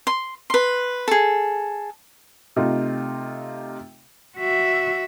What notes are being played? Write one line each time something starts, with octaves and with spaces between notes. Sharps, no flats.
C6
B4 C6
G#4 A4
C3 A3 D#4 F4
F#4 E5